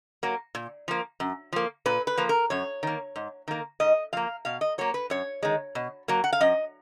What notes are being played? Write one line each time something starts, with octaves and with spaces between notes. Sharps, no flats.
F#3 A#3
A#2
F3 A#3
F#2
F3 A#3
A#2 B4
B4
F3 A#3
A#4
F#2 C#5
D#3 A#3
G#2
D#3 A#3
G#2 D#5
F3 A#3 F5
B2 F5
D#5
F#3 A#3 C#5
B4
F#2 C#5
D#3 G#3
B2
F#3 A#3
F#5
F5
F#2 D#5